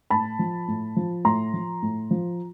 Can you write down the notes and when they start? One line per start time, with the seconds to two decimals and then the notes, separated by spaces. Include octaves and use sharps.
0.10 A2 A5 B5
0.39 F3
0.68 A2
0.96 F3
1.25 A2 A#5 C6
1.54 F3
1.82 A2
2.11 F3